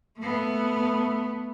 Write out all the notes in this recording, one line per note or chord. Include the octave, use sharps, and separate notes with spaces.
A3 B3